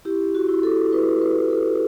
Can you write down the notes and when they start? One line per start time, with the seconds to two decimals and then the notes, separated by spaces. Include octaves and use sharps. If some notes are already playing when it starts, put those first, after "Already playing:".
0.05 E4 G4
0.35 F#4
0.49 E4
0.63 A4
0.93 E4 B4
1.22 B4
1.35 E4
1.50 A4